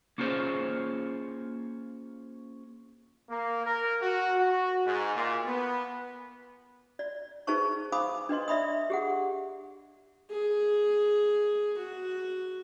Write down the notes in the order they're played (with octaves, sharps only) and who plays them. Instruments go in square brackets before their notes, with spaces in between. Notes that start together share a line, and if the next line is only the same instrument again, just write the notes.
[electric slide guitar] A#3 C#4 F4 G#4 C5 C#5
[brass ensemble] A#3
A#4
F#4
F#4
G#2
A#2
B3
[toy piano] D5
D#4 G#4 B4 C5 A5 C#6
C5 F5 G#5 B5 D6 D#6
D4 B4 D#5 C6
D5 E5 B5 D#6
G4 G#4 F#5
[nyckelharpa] G#4
F#4